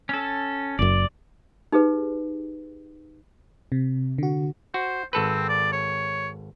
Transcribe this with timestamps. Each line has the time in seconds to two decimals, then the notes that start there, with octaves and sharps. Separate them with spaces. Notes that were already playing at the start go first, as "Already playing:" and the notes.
0.09 C#4 A4
0.79 F#1 F#2 D5
1.72 D#4 G4 G#4 B4
3.72 C3
4.18 D3 F#4
4.74 F#4 C5
5.13 G#1 C4 A4 B4
5.49 D5
5.72 C#5